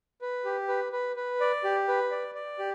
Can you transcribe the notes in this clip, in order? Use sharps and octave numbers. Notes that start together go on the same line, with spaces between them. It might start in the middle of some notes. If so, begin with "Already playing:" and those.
B4
G4
B4
B4
B4
D5
G4
B4
D5
D5
G4